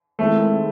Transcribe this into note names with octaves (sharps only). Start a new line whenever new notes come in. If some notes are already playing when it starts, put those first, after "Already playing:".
D#3 G#3 A3 C4 E4